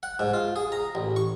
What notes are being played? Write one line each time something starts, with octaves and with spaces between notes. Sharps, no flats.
F#5
G#2
F4
G#4
A#5
A1
C#6